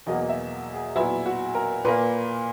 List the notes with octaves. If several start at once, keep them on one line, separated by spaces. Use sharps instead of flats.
E2 B2 F#3 A#3 D#5
E5
G#4
A#2 F#3 B3 E4
F#4
A#4
A#2 A#3 B4